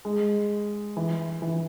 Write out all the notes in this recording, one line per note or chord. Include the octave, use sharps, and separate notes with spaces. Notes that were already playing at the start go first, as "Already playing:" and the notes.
G#3
E3
E3